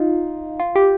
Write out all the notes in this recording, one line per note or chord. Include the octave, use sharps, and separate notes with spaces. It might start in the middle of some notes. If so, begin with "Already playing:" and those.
Already playing: D#4 F4
F4
G4